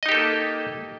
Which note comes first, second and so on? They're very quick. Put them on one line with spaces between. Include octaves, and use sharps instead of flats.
D#5 D#4 G4 A4 A#3